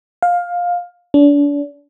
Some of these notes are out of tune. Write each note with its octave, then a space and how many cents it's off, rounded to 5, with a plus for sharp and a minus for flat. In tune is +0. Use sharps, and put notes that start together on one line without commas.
F5 +15
D4 -35